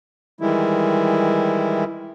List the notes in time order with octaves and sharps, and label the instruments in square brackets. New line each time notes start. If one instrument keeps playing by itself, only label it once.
[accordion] D#3 E3 G3 G#3 E4